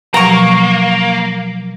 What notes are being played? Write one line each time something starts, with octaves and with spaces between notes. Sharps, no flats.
B2 F3 F#3 A#3 A#5 C#6